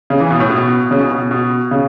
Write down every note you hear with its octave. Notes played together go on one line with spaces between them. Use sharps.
C#3
E3
B2
A2
B2
C#3
B2
B2
B2
C#3